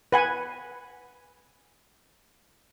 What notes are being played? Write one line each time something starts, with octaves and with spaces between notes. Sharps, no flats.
B4 F#5 G#5